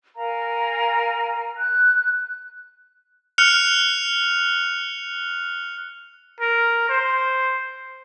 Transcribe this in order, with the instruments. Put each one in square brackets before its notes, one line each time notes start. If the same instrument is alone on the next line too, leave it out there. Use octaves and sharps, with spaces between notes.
[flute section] A#4 F5 G#5 A#5
F#6
[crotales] F6 F#6 C#7 F7
[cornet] A#4
C5